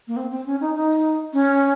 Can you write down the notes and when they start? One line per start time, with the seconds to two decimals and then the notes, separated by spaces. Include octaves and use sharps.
0.08 A#3
0.17 C4
0.31 C4
0.46 C#4
0.61 D#4
0.75 D#4
1.33 C#4